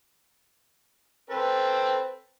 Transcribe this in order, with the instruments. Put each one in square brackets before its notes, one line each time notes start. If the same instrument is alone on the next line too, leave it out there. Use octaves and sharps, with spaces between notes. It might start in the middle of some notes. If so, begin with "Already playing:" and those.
[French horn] C4 [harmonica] A4 B4